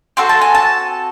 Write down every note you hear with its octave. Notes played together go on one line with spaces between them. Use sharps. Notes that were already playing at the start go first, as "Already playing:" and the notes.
C4 F#4 A4 C6
A5
G#5
A5